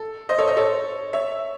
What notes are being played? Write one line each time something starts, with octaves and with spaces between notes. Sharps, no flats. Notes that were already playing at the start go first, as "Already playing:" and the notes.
Already playing: A4
C5 D#5
A4 C#5
C5 D#5
A4 C#5
C#5 E5